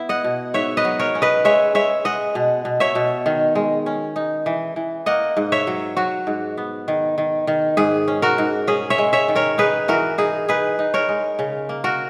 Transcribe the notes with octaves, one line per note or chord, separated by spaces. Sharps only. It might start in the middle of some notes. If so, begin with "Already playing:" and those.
Already playing: B3 E4
D#5 F#5
B2
G#2 C#5 E5
B4 D#5
F#3
A#4 C#5
C#4
B4 D#5
G#3 C#5 E5
G#3 C#5 E5
G#3 D#5 F#5
B2
B2
C#5 E5
B2
D#3
G#3
C#4
D#4
E3
E3
A#3 D#5 F#5
G#2
C#5 E5
F#3
F#3 F#4
G#2
B3
D#3
D#3
D#3
G#2 G#4
C#4
F#4 A#4
G#2
C#4 G#4
C#5 E5
G#3
C#5 E5
D#3
A#4 C#5
D#4 G#4 B4
E3 F#4 A#4
D#4 G#4
D#4 G#4 B4
D#4
A#4 C#5
G#3
C#3
A#3
F#4 A#4